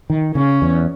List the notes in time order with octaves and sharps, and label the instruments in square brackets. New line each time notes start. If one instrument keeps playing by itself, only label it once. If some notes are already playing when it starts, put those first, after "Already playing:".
[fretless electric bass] D#3
[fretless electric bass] C#3 [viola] C#4
[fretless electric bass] E2